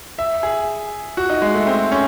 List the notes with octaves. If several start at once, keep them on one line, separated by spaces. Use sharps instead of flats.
E5
G#4
F#4
D#4
G#3
A3
C4
C#4